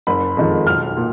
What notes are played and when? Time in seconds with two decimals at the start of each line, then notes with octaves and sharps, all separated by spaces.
0.07 F#1 B5
0.37 F2 D#3 G#3
0.67 B1 F6
0.97 A#2